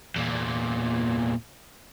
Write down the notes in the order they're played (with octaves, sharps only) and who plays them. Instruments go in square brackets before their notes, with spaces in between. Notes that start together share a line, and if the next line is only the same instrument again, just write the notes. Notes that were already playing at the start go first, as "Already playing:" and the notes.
[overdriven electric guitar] E2 A#2